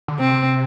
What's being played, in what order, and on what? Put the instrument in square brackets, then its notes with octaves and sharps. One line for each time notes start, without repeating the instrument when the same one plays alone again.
[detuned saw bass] D3
[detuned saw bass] C3 [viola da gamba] C4